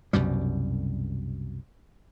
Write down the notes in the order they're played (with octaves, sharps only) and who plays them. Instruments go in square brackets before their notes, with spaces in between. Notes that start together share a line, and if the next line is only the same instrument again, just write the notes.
[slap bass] C2 F#2 B2 G3